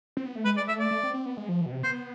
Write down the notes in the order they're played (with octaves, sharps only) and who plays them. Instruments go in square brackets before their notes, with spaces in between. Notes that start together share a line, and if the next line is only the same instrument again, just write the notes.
[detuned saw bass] C4
B3
A3
[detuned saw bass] G#3 [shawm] B4
[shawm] D5
[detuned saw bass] A3 [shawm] E5
[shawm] D5
[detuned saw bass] A3
C4
C4
B3
G#3
F3
E3
B2
C3
[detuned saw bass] B3 [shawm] C5